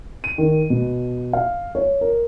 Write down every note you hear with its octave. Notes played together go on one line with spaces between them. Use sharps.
D#7
D#3
B2
F5
C#5
A#4